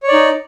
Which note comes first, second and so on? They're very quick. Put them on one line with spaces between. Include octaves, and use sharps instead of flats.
C#5 D5 D#4